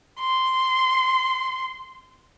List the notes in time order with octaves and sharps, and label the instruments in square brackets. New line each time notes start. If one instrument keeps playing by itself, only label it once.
[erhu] C6